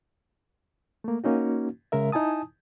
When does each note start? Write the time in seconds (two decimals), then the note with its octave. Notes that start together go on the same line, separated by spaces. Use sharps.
1.04 A3 A#3
1.24 A#3 C#4 D#4 F#4
1.92 C#3 G#3 A#4 E5
2.12 D#4 E4 G#5 A5 D#6